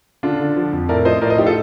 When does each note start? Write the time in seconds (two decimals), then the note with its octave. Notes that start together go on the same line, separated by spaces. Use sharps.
0.23 D3 D4 F4
0.40 D3
0.56 F3
0.73 F2
0.89 A2 A#4 D5
1.05 F3 C5 D#5
1.22 A2 A#4 D5
1.30 C5 D#5
1.38 F3 D#4 G4
1.46 F4 A4